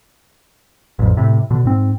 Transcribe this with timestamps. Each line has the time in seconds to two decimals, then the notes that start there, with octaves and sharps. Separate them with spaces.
0.99 A1 F2
1.17 A2 C3
1.51 B2 D3
1.65 G#2 C4